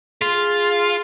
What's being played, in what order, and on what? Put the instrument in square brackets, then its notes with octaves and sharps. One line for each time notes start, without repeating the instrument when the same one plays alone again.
[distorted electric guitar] F4 [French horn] G#4